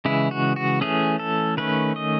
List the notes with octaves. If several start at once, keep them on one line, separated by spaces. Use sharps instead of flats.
C#3 E3 G#3 E4
F#4
F#4
E3 A3 C#4 G#4
A4
D#3 A3 C#4 B4
D#5